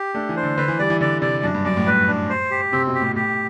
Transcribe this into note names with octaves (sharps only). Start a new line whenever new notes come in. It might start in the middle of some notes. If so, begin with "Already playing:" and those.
Already playing: G4
A3 D4
E3
C5
D3
D3 B4
E3
G3 D5
E3
D3 D5
C3 D5
F#2 D4
G2
F#2 D5
A2
G2 B4
D4
C5
G4
C3 C4
B2
G4
A2
A2 G4